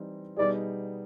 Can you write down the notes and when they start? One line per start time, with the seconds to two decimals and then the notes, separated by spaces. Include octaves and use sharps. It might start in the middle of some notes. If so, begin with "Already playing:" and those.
Already playing: E3 G3 C4 D#4
0.37 B2 G3 B3 D#4 G#4 D5